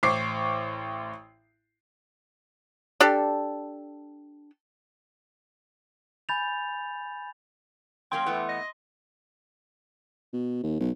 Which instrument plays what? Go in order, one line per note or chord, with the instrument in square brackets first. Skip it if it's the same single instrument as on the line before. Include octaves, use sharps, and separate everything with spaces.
[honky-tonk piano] A1 C5 C#6 D6 C7
[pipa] D4 G4 A4
[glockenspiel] G#5 B5 G6 A6 F7
[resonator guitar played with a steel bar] F#3 A#3 C#4 [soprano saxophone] G5 [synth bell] C6
[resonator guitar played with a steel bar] E3 A3 B3
[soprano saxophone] D#5
[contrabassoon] B2
D#2
B1